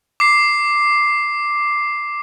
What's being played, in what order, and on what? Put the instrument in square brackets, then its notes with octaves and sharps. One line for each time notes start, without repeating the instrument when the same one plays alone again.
[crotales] D6 C7